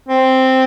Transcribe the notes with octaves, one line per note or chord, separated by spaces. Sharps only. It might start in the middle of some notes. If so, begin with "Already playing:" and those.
C4